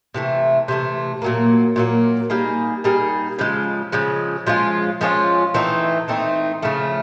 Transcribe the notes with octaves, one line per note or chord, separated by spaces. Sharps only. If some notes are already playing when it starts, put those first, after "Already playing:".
C3 E3 A3
C3 E3 A3
A#2 F#3 A#3
A#2 F#3 A#3
G3 A#3 D#4 G#4
G3 A#3 D#4 G#4
C#3 F3 G#3
C#3 F3 G#3
F3 G#3 C#4 F4
F3 G#3 C#4 F4
E3 A3 C4 D#4
E3 A3 C4 D#4
C#3 F3 A3